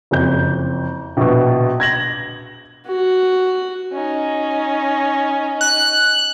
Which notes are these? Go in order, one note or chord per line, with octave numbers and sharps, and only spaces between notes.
F#1 F2 G6
A#1 B2
G#6 A#6 F#7
F#4
C#4 D#4
F#6